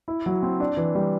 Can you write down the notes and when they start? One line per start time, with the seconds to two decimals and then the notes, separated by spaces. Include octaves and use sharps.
0.08 E4
0.26 F#3
0.43 C4
0.60 D4
0.77 E3
0.95 G3